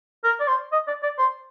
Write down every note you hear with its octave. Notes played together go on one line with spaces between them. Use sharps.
A#4
D5
C5
D#5
D5
D5
C5